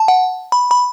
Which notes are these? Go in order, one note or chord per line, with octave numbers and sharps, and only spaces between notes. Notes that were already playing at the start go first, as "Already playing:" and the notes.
Already playing: A5
F#5
B5
B5